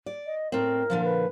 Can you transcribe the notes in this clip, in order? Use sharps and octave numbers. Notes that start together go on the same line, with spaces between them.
D5
D#5
A2 C4 A#4
A#2 D3 F3
B4